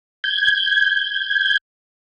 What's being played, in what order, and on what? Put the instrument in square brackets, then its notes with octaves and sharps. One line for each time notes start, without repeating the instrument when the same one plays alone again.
[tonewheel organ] G6 G#6